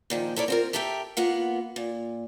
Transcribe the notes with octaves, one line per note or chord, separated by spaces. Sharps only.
A#2 D#3 F3
E4 A4 A#4 C#5 D5
C4 F4 A#4
G4 A4 A#4 E5 F#5 G5
A#3 B3 F4 F#5
A#2